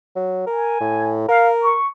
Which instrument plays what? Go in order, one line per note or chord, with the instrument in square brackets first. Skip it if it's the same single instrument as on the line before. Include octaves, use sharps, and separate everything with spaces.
[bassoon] F#3
[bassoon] A#4 [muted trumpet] G#5
[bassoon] A2
[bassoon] A#4 [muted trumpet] F5
[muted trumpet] C#6